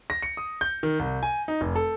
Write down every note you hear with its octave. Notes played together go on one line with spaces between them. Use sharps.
A#6
C#7
D#6
G6
D#3
C2
G#5
D#4
F1
A4